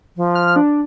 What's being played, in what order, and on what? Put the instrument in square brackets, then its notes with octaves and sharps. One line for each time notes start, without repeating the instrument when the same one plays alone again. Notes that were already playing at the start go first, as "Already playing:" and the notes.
[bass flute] F3
[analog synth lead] F6
D4